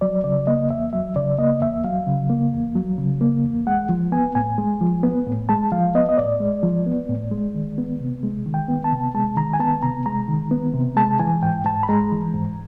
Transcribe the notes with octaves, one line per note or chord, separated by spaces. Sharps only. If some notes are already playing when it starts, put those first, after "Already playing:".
F#3 D5
C#3 D5
A#3 D#5
E2 E5
F#3 E5
C#3 D5
A#3 D#5
E2 E5
F#3 F5
C#3
A#3
E2
F#3
C#3
A#3
E2
G#3 F#5
F3
B3 G#5
A2 G#5
G#3
F3
B3
A2
G#3 A5
F3 F5
B3 D#5
D#5
A2 D5
G#3
F3
B3
A2
G#3
D#3
B3
C3
G#3
D#3
G5
B3
A5
C3
G#3 A5
D#3 A#5
G#5
B3 A5
C3 A#5
G#3 A#5
D#3
B3
C3
G#3 A5
E3 G#5
G#2 G5
G#2 A5
B5
G#3 A#5
E3
G#2